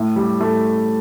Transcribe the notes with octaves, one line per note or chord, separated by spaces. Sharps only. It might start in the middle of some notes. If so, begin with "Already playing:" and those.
Already playing: A2
G3
A2 A3